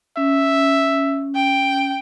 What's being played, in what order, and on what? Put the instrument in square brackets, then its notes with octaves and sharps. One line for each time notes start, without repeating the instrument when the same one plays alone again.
[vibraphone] C#4 [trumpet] E5
[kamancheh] G5